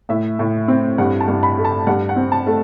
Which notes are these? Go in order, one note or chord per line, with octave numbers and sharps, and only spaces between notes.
A2 E5
A2
C4
G2 F#5
A5
G2
B5
A3
A5
G2 F#5
F#5
C4
A5
A3